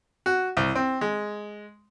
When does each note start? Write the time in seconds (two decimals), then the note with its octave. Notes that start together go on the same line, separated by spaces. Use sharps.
0.26 F#4
0.57 C2
0.75 C4
1.01 G#3